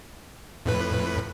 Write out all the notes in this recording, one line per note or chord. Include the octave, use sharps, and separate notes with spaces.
F2 A2 B4